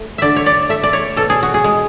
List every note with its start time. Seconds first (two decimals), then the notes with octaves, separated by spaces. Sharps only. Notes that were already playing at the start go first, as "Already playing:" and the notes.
Already playing: A3
0.18 D3 D5 E5
0.36 C#5
0.46 D5
0.69 A3 E5
0.83 D5
0.93 C#5
1.16 B2 A4
1.30 G#4
1.43 F#4
1.54 G#4
1.64 G#3